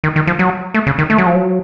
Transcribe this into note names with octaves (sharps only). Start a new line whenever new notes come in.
D#3
D#3
F3
F#3
A3
C#3
D#3
A3
F#3
F3
F#3